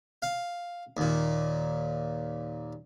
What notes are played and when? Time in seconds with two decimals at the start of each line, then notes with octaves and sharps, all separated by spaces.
0.22 F5
0.97 D#2 A#2